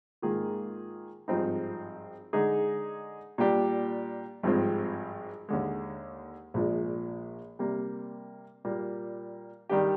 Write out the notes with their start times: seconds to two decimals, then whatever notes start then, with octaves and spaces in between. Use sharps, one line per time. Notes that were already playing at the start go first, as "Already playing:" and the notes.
0.22 G#2 D#3 A#3 F4 G#4
1.28 G#1 G2 F3 C4 D#4
2.33 D3 G#3 D#4 G#4
3.38 A#2 G3 D4 G4
4.43 G#1 G2 F3 G#3 C4
5.49 D#2 D3 G#3
6.54 A#1 A#2 F3 G#3 D4
7.59 C3 G3 A#3
8.65 A#2 G3 A#3
9.70 D#3 G3 D4 G4